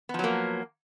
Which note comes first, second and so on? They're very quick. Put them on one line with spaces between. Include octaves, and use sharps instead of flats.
B3 F3 F#3 A#3